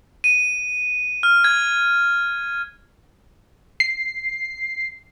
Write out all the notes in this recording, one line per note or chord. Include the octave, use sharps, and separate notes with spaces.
D#7
F6
G#6
C7